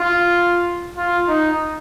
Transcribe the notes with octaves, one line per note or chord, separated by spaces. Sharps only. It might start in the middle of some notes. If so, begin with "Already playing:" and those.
Already playing: F4
F4
D#4